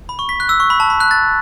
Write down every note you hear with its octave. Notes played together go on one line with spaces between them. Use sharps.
B5
C#6
B6
F#6
E6
C#6
B5
A5
B5
F#6
A6